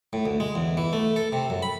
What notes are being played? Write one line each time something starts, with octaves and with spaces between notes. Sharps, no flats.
A2
D2
G#3
E2
E3
A3
A4
C3
F#2
B5